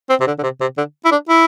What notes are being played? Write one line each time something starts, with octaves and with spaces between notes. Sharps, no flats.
C4
C3
D3
D3
C3
C3
D3
E4
D4
E4